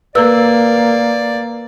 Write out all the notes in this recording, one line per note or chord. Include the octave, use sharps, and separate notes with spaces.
A#3 B4 D5 E6